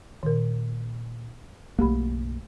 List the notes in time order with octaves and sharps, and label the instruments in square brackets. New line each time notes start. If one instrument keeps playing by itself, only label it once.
[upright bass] A#2 [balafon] D#3 A#4
[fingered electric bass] B1 A#3 [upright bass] F#2 C#3 [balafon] A3 G4 B5